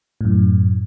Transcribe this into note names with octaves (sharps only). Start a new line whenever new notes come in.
F#2 A2